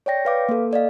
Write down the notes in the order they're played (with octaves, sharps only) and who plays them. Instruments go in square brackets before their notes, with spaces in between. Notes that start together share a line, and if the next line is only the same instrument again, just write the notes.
[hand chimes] C#5 D5 G5 A#6
B4 F5 D6
A#3 A4
A4 D5 D#5 F5